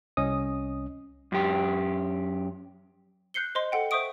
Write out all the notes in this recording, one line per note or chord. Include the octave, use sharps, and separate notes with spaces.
C2 C#4 D#5 D#6
F#2 G4
F#6 G6 C7 C#7 G7
C5 D#5 C6
A4 F#5 G5
C5 E5 C#6 D#6 D7